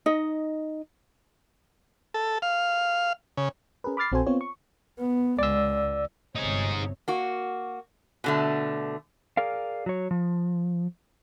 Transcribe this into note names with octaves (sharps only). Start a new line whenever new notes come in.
D#4 D#5
A4
F5
C#3
C#4 G#4 A#4 B4
B5 D6 F6 A6 C7
A#1 C4 F#4 A4 C5 G#5
B3 C4 F4 C#5
C#6
B3
C#2 G#3 D5 E6
G1 C3 D#4 G#4 C#5
A#3 F#4
B2 D3 A3
G#4 A#4 D5 F5
F#3 C#5
F3